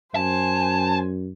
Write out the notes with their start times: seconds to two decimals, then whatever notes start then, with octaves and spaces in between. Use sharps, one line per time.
0.16 F#2 C5 G#5 A5